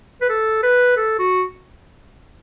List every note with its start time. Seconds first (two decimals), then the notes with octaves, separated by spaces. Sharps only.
0.21 B4
0.29 A4
0.63 B4
0.96 A4
1.19 F#4